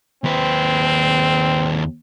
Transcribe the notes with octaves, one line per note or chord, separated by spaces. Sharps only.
D#2 C4 B4